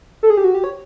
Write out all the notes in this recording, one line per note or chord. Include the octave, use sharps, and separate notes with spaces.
A4
G#4
G4
F#4
G4
C#5